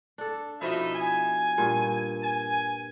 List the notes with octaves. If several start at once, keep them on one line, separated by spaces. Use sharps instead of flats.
D4 A4
B2 F3 D#4 E4 D#5 E5
G#5
G2 A#2
G#5